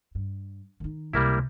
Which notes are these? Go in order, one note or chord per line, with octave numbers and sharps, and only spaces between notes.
G2
D#3 D#4
C#2 C3 G3 A#3 E4